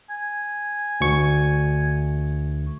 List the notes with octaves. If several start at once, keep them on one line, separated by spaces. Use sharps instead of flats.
G#5
D2 C#6